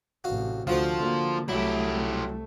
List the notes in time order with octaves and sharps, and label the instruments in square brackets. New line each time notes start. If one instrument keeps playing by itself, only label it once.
[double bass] A1 C3 [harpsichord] F#4 F5
[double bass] D2 [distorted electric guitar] F3 [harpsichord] F4 F#4 C5
[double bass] D3 A#3
[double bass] C2 A3 [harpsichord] F#3 [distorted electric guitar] E4 G4